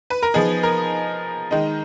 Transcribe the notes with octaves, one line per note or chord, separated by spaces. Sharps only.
B4
A#4
F3 B3 D#4 G#4
A#4
D#3 G#3 D#4